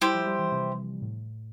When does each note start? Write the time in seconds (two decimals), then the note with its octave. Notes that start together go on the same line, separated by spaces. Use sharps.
0.01 G3 E4 G4 C5
0.14 F3
0.27 G3
0.39 E3
0.52 C3
1.02 A2